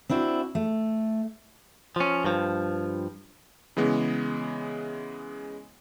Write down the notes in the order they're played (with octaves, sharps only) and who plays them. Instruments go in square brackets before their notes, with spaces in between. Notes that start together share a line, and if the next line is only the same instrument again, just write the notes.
[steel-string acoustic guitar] C4 D4 E4 F#4
A3
[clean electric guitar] F3 C#4
G2 F3
[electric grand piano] C#3 E3 G#3 B3